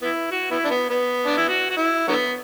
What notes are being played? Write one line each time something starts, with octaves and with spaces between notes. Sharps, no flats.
B3 E4
F#4
B3 E4
D4
B3
B3
D4
E4
F#4
F#4
E4
D3 F#3 B3